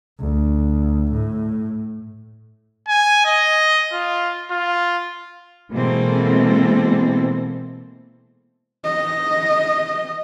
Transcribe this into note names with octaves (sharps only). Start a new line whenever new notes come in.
D2
A2
G#5
D#5
F4
F4
B2 E3 G#3 A#3 C4 A4
D#5